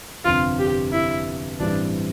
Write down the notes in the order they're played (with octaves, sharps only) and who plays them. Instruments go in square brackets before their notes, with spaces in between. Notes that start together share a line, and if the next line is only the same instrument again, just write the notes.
[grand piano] G1 F2 C3 [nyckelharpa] F4
[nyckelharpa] G4
E4
[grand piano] A1 G2 E3 G3 C4 [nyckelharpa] D4